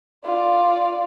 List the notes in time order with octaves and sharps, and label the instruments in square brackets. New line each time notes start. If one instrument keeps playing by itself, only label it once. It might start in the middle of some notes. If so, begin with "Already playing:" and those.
[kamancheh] F4 D5